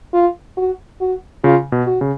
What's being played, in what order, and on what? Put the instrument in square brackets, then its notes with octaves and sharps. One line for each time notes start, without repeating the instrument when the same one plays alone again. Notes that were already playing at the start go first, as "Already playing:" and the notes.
[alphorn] F4
F#4
F#4
[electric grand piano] C#3 [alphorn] F4
[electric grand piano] B2
[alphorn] F#4
[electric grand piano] C#3